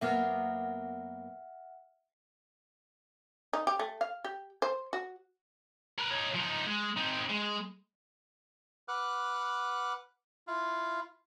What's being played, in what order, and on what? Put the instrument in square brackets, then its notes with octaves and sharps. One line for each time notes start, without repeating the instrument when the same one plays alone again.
[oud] F#2 A#3 B3 [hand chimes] E5 F#5 F6
[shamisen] D#4
G4
A3
F5
G4
C5
F#4
[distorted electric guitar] A#4 B4
D#4 C#5
F3 D#4
G#3
C4 D#4
G#3
[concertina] B4 F#5 D6 F6 F#6
E4 F4 F5